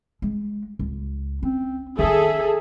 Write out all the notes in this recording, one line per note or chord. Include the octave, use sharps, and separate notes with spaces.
G#3
C#2
C4 C#4
D#3 C#4 G#4 A4 E5